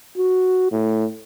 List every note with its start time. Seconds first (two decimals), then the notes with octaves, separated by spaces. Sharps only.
0.17 F#4
0.72 A2